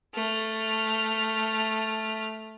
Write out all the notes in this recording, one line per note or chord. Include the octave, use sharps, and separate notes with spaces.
A3 F6